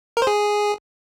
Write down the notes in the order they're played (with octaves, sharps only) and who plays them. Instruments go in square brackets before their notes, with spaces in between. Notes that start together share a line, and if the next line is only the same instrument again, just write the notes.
[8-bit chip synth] A#4
C5
G#4